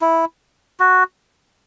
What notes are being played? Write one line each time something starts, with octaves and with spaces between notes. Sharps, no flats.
E4
F#4